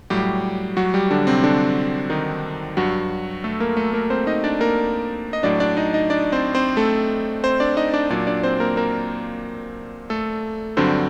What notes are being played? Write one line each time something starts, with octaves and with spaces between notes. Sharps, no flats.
A2 F#3 G3 G4
F#3 F#4
G3 G4
D3 D4
C3 C4
D3 D4
D#3 D#4
G2 F#3 F#4
A3 A4
A#3 A#4
A3 A4
A#3 A#4
C4 C5
D#4 D#5
D4 D5
A#3 A#4
D#5
A2 F#3 D4 D5
D4 D5
D#4 D#5
D#4 D#5
D4 D5
C4 C5
C4 C5
A3 A4
C4 C5
D4 D5
D#4 D#5
D4 D5
A#2 F#3 D4 D5
D4 D5
C4 C5
A#3 A#4
A#3 A#4
A3 A4
G2 D3 F#3 C4 C5